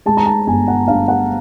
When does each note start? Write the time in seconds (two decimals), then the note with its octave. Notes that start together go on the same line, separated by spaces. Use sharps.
0.06 G#3 A5
0.17 A#5
0.26 A5
0.47 G1 G#5
0.68 F#5
0.88 G2 F5
1.08 F#5